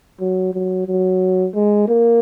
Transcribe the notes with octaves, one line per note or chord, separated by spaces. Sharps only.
F#3
F#3
F#3
G#3
A#3